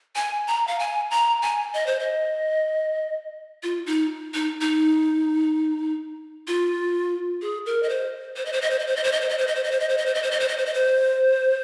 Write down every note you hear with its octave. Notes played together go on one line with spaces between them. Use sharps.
G#5
A#5
F5
G#5
A#5
G#5
D#5
C5
D#5
F4
D#4
D#4
D#4
F4
G#4
A#4
D#5
C5
C5
D#5
C5
D#5
C5
D#5
C5
D#5
C5
D#5
C5
D#5
C5
D#5
C5
D#5
C5
D#5
C5
D#5
C5
D#5
C5
D#5
C5
D#5
C5
D#5
C5